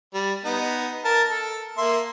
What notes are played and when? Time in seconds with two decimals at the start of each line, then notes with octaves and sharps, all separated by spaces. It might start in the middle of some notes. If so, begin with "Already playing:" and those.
0.14 G3
0.44 B3 D#4
1.05 A#4 A5
1.30 A4
1.78 A#3 E5 C6